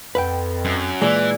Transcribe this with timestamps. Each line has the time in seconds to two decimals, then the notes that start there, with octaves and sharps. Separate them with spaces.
0.15 F2 B4 F#5 G5
0.65 F#2
1.02 A#2 E3 G#3 D5